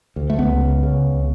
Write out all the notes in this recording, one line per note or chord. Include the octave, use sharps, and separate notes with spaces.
D2
A3
C#2 B3
C#3
C#3
C#2